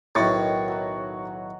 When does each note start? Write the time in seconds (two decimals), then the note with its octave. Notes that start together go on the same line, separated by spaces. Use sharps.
0.15 B1 A2 D#3 F#4 C#6 A6
0.68 F#3 F#4